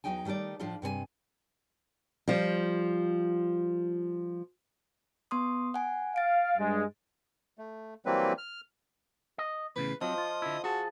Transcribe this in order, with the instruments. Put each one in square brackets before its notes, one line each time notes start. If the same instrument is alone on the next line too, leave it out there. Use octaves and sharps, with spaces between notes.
[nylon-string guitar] E2 G2 F#3 D#4 G5 G#5
D#3 G3 A3 D#4 D5
A2 F3 D4 F4 A4 F5
G2 C3 B4 G#5
F3 G3
[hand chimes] B3 C6 D#6
F#5 G#5
[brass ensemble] F5 [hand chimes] A6 D7
[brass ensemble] G2 G#3
[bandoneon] A3
E3 F#3 G3 A#3 C4 B4
F6
[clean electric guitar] D#5
[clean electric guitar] E2 A2 C#3 [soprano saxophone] B4
[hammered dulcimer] F3 [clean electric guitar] F#3 C4 [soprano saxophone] D#5
[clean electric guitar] F4
D3 E4
[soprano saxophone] F#4 [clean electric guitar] G#4 A5